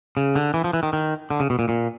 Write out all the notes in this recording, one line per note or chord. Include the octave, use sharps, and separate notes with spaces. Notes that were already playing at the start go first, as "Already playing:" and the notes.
C#3
D3
E3
F3
E3
D#3
D#3
D3
C#3
B2
A#2
A#2